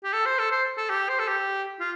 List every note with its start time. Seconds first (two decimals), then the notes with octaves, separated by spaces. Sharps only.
0.04 G4
0.13 A4
0.26 C5
0.39 A4
0.51 C5
0.77 A4
0.89 G4
1.09 C5
1.19 A4
1.28 G4
1.80 F4